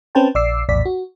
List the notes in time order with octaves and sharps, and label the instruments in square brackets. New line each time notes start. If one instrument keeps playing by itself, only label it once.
[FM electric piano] C4 C#4 B4 C5 G5 A5
A#1 D5 D6 E6 C7
A#1 E2 A2 D5 B6
F#4